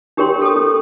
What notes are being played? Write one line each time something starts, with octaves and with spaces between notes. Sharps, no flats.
D4 G4 A#4 C#5 G5 C6
A4 D#6
C#4